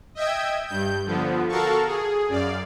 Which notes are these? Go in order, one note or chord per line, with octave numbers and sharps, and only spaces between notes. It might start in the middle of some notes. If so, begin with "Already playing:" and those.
D#5 E5 G5 G#6
G2 G6
D3 F3 B3
F#4 A4 A#4 F5 A5 C#6
G#4
F#2 D5 F5